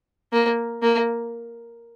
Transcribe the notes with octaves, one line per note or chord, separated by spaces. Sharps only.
A#3
A#3